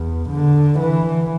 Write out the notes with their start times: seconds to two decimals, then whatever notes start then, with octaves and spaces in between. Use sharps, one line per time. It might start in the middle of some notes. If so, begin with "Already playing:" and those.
Already playing: E2
0.29 D3
0.80 E3